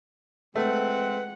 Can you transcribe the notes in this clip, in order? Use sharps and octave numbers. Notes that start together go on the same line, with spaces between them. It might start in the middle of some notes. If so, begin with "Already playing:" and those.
G#3 A3 C4 B4 F#5